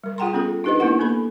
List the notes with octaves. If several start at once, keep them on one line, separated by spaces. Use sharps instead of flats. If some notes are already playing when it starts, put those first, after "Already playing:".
G3 A#4
F4 G#4 F#5 G5 A#5 C6
B3 C#4 F4 G#4 A4
D4 D#4 G4 B4 C5 D#5
A#3 B3 D4 E4 A#4 F#5
A#3 B3 A4 B5